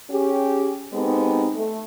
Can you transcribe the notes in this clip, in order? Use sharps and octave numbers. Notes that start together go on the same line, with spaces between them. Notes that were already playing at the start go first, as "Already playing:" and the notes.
C#4 G4 G#4
G#3 B3 C4 D#4 G4 A4
A3